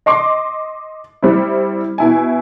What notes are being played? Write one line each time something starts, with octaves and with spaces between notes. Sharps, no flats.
D#5 C6 D6
G3 C4 E4
B2 E4 G#5